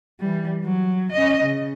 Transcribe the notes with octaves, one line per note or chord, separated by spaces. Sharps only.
E3 G3
F#3
C#4 D#5
C#3